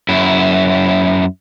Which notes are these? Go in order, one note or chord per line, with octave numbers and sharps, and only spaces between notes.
F#2 E4